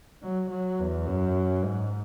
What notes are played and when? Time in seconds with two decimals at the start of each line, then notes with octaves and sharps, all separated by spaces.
0.22 F#3
0.50 F#3
0.79 E2
1.07 F#2
1.64 G#2